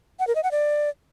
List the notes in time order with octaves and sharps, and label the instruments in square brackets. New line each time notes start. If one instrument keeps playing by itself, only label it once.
[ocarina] F#5
A#4
D#5
F#5
D5